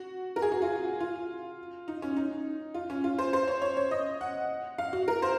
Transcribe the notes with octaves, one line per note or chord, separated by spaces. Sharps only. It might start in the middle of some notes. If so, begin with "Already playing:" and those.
Already playing: F#4
A#4
G#4
F#4
F4
F4
D#4
C#4
D#4
F4
C#4
F4
C5
C5
C#5
C#5
C#5
D#5
F#5
F5
F#4
A#4
C5